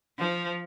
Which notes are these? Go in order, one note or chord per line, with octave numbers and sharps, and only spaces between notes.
F3